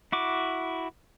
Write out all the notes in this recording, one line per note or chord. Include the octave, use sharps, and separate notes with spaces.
E4 F#4 D6